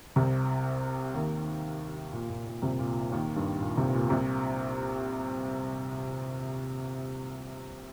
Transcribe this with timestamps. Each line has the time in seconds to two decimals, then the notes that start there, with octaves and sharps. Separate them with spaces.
0.16 C2 C3
1.14 D#2 D#3
2.13 A#2
2.30 A#2
2.46 A#2
2.62 C2 C3
2.79 A#2
3.12 D#2 D#3
3.36 G2
3.61 A#2
3.77 C2 C3
3.94 A#2
4.10 C2 C3